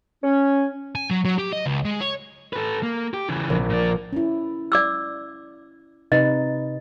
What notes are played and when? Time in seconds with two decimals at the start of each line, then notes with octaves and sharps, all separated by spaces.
0.24 C#4
0.95 G#5
1.11 F#3
1.25 F#3
1.38 G4
1.53 D#5
1.66 C#2
1.85 G#3
2.01 C#5
2.53 A4 B4
2.83 A#3
3.14 G4
3.29 C#3 E3
3.50 A#1
3.70 A#2 D5
4.13 C#4 E4
4.72 D5 D6 E6
6.12 C3 D#4 B4 D#5